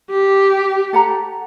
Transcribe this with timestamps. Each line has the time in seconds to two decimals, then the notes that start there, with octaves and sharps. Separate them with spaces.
0.10 G4
0.93 A4 F#5 A#5